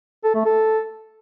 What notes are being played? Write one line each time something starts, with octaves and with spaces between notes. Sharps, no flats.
A4
A3
A4